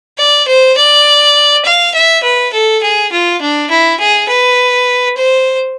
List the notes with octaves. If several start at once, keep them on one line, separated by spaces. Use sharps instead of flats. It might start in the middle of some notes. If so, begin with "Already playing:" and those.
D5
C5
D5
F5
E5
B4
A4
G#4
F4
D4
E4
G#4
B4
C5